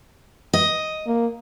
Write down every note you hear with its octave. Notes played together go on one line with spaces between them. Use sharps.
D#5
A#3